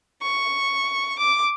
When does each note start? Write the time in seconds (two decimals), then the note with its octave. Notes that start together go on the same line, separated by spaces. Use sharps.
0.23 C#6
1.20 D6